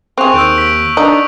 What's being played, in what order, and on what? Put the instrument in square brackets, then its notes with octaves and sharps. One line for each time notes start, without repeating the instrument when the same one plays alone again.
[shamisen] C4 G#4 [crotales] C#6 F#6 F7
[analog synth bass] D#2 [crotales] E6 G6 D7
[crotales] B6 D7
[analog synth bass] D4 [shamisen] D#4